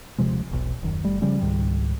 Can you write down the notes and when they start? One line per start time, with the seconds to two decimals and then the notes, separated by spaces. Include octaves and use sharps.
0.18 D#1 C3 F3 G#3
0.51 E1 B1
0.83 D#1 F#2 D#3
1.04 F#1 G3 A3
1.22 C#3 F3 G3 C#4
1.40 C#2 G#2 D#3 G3